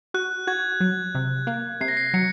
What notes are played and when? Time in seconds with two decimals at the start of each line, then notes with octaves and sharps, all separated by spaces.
0.14 F#4 F#6
0.47 F#4 G#6
0.80 F#3
1.15 C3
1.47 A#3
1.81 C3 C7
1.88 A#6
1.97 C7
2.14 F#3 C#7